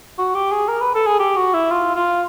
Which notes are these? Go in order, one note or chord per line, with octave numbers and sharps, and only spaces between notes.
F#4
G4
G#4
A#4
B4
A4
G#4
G4
F#4
E4
F4
F4